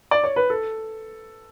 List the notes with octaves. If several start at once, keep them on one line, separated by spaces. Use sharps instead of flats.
D5
C#5
B4
A4